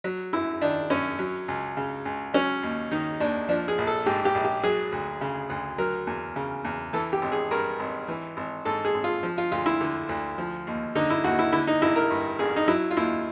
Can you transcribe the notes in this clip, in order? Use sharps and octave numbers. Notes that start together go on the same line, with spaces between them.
F#3
F#2 E4
D#3 D4
F#2 C#4
F#3
C#2
C#3
C#2
F#3 C#4
D#2
D#3 D#4
D#2 D4
F3 D4
G#4
A#1
A4
G#2 G4
G4
A#1
G4
F#3 G#4
D2
C#3
D2
F#3 A#4
E2
C#3
E2
E3 A4
G4
G#1
G#4
G2 A#4
G#1
E3
G#1
G#2 A4
G#4
G#1
F4
F3
F4
D2 F4
E4
D3
D2
F3
D#2
D3 D#4
E4
D#2 F#4
E4
D3 E4
D#4
A1 E4
A#4
G2
A1 G#4
D#4
F#3 E4
F4
D#2 E4